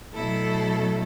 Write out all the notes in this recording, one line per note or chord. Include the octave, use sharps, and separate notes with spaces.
B2 F#3 A3 E4 A4